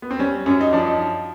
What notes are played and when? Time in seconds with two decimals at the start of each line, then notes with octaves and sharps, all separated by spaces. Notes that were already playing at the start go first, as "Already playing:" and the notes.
0.02 B3
0.11 C4
0.19 G3 C#4
0.46 F#2 C#4
0.61 D#4
0.73 F3 D4
0.87 D#4